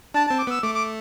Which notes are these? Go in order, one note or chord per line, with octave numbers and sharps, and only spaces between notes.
D4 A5
C4 A5
D6
B3 E6
A3 D6
D6